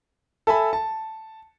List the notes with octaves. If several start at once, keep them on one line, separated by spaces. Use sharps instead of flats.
A4 E5 G#5 B5
A5